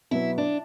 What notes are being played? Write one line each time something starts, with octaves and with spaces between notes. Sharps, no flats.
B2 F#3 B3 E4
D4